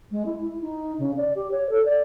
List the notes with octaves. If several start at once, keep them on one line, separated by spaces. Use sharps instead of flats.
G#3
E4
E4
D#4
C#3
D5
G4
C#5
A4
D5